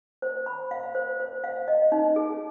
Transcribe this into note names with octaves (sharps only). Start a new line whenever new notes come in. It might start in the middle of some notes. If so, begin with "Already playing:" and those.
C5
B5
F5
C5
C5
F5
D#5
D#4
G#4